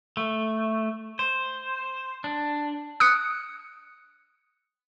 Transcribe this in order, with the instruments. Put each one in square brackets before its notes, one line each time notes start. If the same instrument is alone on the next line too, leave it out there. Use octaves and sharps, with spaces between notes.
[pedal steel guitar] A3
C5
D4
[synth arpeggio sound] D#6 F#6 C#7